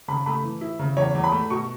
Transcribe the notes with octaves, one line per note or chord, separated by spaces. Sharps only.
C#3 B5
A3 B5
E3
E4
C#3
E2 C#5
E2
B5
A3
B2 C#6